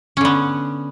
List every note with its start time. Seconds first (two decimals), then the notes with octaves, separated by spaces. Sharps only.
0.17 C#4
0.21 D3
0.25 B3